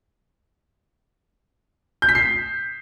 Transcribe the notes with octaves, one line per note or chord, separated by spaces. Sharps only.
G6
B6
C7